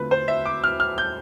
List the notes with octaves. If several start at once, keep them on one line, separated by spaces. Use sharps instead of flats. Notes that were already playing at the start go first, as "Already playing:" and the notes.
Already playing: D3 A3 C4 F4 B4
C5
E5
D6
F6
F6
G6